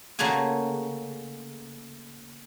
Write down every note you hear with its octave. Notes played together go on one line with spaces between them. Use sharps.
C#3 A3 A#3 F#4 G#4 G#5